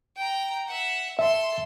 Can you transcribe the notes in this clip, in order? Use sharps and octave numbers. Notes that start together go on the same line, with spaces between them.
G5 A#5
E5 F#5
A4 E5 C6